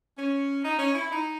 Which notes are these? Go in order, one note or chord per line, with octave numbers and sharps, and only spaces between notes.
C#4
D#4
C#4
E4
D#4